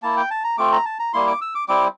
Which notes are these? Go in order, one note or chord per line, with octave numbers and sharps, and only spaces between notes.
A#3 E4 A5
G5
A5
A#5
A3 C4 F4 D6
A#5
A5
A#5
G3 A#3 E4 C6
D6
E6
D6
G3 C4 E4 D6